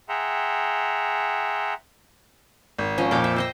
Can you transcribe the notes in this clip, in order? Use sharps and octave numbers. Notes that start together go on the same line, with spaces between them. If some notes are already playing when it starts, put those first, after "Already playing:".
G#4 E5 F#5 G5 A#5 C6
G#1
F3 C#4 D#5
F2 A#2 G5 D6
E5
C5 D#5 G5